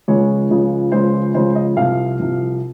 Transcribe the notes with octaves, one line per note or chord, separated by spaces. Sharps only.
C#2 C#3 F3 G#3 C#5
C#2 C#3 F3 G#3
C#2 C#3 F3 G#3 C5
C#2 C#3 F3 G#3 C5
D#5
C2 C3 F3 F5
C2 C3 F3